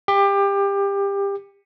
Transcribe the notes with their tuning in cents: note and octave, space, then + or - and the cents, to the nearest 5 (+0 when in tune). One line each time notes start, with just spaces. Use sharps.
G4 +25